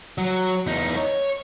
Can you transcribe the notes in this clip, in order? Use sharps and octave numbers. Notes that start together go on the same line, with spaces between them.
F#3
E2 D#4
C#5